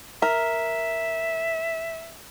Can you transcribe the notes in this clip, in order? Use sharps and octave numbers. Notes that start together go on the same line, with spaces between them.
A#4 E5